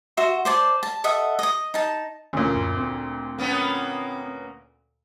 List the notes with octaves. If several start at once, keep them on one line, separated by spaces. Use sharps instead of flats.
F#4 E5 C6
C5 D5 A5
A5
A4 D#5 E5 F#5
D#5 D#6
D#4 A5
D2 A#2 C#4
F#2
C4
A#3 B3 C#4